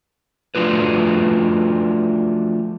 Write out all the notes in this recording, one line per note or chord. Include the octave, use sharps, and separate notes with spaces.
F3 A3 D4 F4 F#4 B4